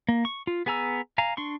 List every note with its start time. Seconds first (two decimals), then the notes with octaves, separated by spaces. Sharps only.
0.09 A#3
0.25 C#6
0.47 F4
0.66 B3 G#4 G#5 A#5 E6
1.18 F5 G#5 A#5
1.37 D4 C6 C#6